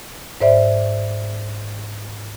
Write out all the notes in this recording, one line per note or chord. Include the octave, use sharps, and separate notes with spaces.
G#2 C5 D5 E5